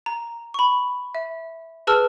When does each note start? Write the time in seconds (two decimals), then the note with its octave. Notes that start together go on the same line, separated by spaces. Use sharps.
0.06 A#5
0.54 B5 C#6
1.15 E5
1.87 G#4 B4 A5 E6 F6